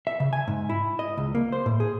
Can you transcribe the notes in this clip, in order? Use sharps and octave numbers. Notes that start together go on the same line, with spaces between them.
E5
C#3
G#5
G#2
E4
D#5
C#2
A#3
C5
A2
G#4